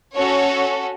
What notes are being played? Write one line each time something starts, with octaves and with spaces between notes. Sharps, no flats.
C#4 F#4 A4 C#5